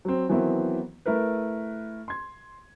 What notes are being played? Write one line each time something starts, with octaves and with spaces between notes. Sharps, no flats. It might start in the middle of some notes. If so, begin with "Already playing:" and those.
F#3 C4
D#3 E3 F#3 B3 C4 E4
A3 E4 A#4 B4
C6 G#6